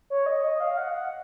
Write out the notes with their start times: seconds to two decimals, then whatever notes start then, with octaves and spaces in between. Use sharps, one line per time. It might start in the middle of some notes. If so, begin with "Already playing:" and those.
0.10 C#5
0.26 D#5
0.43 D#5
0.60 F5
0.77 F#5
0.94 F#5